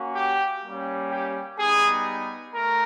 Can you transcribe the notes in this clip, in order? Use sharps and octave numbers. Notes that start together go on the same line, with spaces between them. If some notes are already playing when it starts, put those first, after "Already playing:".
Already playing: A#3 C#4 F#4
G4
G3 A#3 C#4
G4
G3 B3 D#4 G#4
A3 A#4